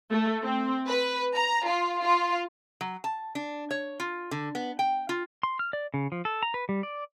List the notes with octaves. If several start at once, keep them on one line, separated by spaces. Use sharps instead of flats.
A3
C4
B4
A#5
F4
F4
F#3
A5
D4
C#5
F4
D3
B3
G5
F4
C6
F6
D5
C#3
F3
A4
A#5
B4
G3
D5